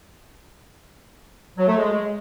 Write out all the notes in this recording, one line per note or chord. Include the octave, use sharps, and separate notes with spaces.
F#3
A3
G#3